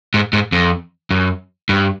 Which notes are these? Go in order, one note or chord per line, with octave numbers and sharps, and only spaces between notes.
G#2
G#2
F2
F#2
G2